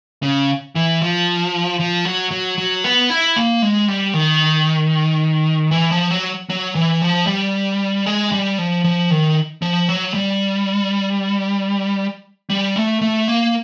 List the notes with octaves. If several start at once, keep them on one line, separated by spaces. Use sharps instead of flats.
C#3
E3
F3
F3
F#3
F#3
F#3
B3
E4
A#3
G#3
G3
D#3
E3
F3
F#3
F#3
E3
F3
G3
G#3
G3
F3
F3
D#3
F3
F#3
G3
G3
A3
A3
A#3